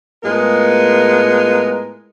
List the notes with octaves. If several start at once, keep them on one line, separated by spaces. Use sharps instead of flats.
A2 G#3 B3 F4 A#4